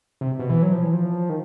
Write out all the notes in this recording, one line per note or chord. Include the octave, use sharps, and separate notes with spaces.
C3
B2
E3
F#3
F3
E3
F3
D#3